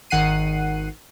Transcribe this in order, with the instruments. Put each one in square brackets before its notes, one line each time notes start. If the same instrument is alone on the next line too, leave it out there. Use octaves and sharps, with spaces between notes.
[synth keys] G#1 D#3 F#5 F#6 C7 D#7